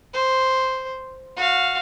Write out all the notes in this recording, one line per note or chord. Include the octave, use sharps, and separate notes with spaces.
C5
F#4 F5